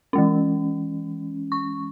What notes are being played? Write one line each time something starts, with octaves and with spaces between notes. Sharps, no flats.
E3 G#3 C#4
C#6